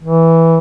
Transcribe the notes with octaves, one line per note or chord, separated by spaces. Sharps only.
E3